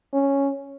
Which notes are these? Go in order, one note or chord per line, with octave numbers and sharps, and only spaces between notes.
C#4